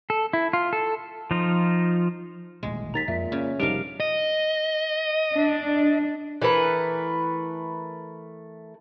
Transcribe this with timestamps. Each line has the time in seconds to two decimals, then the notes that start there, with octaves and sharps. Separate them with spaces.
0.10 A4
0.33 E4
0.53 F4
0.73 A4
1.31 F3 D#4 F4
2.63 D#1 A1 B2 G#3
2.94 D#2 A#5 A6 B6
3.08 F2 A#2 E5
3.32 C#3 A#3
3.60 F1 G#2 G3 D4 G4 A#4 F5 D7
4.00 D#5
5.35 D4
6.42 E3 A3 A#4 B4